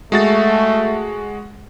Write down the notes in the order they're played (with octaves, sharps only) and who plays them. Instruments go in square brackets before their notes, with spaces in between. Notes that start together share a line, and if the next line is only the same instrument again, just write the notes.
[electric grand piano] G#3 F#4 A6 [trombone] A3